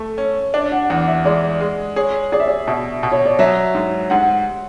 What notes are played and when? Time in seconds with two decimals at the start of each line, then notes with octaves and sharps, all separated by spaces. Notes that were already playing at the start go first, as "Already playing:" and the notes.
Already playing: A3
0.18 C#4
0.54 D4
0.72 F#5
0.90 E2 F#5
1.07 E5
1.25 G#3 D5
1.60 G#3
1.96 G#4 C#5
2.32 G#4 D5
2.40 E5
2.47 D5
2.67 B2 E5
3.03 B2
3.12 C#5
3.26 D5
3.39 F#3 E5
3.75 G#2
4.10 G#2 F#5